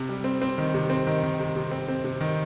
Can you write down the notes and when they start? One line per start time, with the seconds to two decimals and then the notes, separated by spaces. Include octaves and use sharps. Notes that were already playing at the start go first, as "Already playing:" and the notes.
Already playing: C3
0.09 G3
0.24 C4
0.42 C4
0.58 D#3
0.74 C3
0.90 C4
1.07 D#3
1.23 D#3
1.40 C3
1.56 C3
1.71 C4
1.88 C4
2.04 C3
2.21 D#3